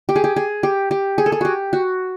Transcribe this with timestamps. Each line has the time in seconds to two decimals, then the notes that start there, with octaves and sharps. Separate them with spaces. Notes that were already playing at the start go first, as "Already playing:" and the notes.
0.09 G4
0.16 G#4
0.24 G4
0.36 G#4
0.63 G4
0.91 G4
1.18 G#4
1.26 A4
1.32 G#4
1.41 F#4 G4
1.73 F#4